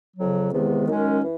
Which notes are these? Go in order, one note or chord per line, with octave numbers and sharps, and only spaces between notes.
F2 C#3 F#3
E2 C3 D#3 G#3 B3
F#2 D#3 G#3 C#4
E3